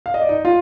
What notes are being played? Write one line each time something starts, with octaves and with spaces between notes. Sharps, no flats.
F5
D#5
D5
D#4 D#5
F4 F5